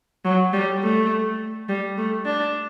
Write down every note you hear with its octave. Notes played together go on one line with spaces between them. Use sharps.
F#3
G3
A3
G3
A3
D4